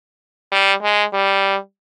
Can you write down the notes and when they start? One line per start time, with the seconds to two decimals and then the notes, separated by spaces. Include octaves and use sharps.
0.52 G3
0.83 G#3
1.13 G3